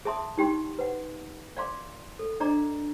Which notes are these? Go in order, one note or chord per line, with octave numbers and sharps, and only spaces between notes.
G#4 E5 A5 C6 D#6
D#4 G4 G5 C6
B4 F#5
D5 F5 C6 D6
A4
D4 D5 D#5 A#5 D6